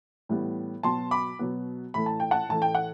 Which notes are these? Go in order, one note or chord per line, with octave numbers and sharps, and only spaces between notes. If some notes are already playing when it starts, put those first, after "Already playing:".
A2 E3 G3 B3
B2 F#3 B3 A5 C6
B5 D6
B2 F#3 B3
A2 E3 A3 B5
A5
G5
F#5 A5
A2 E3 A3 A5
G5
F#5